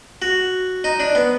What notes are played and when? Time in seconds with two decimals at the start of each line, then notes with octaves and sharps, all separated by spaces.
0.22 F#4
0.84 D#4
1.00 D4
1.15 B3